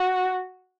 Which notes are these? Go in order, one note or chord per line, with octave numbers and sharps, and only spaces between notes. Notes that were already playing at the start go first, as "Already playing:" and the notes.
Already playing: F#4